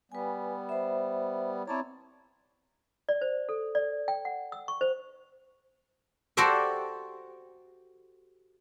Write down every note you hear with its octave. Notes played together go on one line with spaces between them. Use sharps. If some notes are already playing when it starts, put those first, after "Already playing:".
G3 B3 B4 G#5
C5 E5
C4 E4 C#5 D5 A5 A#5
D5
C5
A4
D5
G5
F#5
E6
C#6
C5
F#4 G4 A4 C5 D5 E5